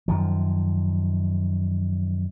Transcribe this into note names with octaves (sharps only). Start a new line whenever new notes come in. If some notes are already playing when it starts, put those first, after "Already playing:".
F#2 D#3 F3